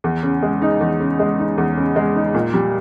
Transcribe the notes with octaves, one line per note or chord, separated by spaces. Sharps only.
E2
C#3
G#3
D#4
E2
C#3
G#3
D#4
E2
C#3
G#3
D#4
A#2
G3